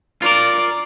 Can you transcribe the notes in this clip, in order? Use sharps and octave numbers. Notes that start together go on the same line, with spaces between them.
F4 A#4 D5